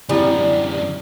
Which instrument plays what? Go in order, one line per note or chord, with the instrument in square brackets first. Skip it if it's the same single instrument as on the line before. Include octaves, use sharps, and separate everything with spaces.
[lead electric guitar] F#2 D3 [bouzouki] G3 [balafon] C4 E4 G#5